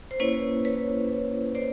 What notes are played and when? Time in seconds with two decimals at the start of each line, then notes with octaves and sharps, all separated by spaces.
0.11 C5
0.20 A#3 C#4 E4 B4 C#5
0.65 B4 C#5
1.55 C5 D5